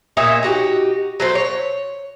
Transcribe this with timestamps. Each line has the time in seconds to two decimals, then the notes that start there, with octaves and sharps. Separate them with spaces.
0.17 A#2 D#4 C#5 E5
0.43 D#4 F#4 G4
1.20 F#3 A3 C4
1.35 C#5